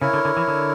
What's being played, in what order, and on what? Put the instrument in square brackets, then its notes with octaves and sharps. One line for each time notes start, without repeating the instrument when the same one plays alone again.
[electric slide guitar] C#3 [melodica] E4 A#4 C#5
[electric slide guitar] D3
D3
E3
D3